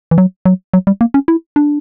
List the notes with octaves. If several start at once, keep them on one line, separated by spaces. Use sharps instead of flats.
E3
F#3
F#3
F#3
G3
A#3
C#4
E4
D4